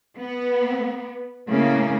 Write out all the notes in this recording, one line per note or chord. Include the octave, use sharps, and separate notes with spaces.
B3
A2 C#3 A#3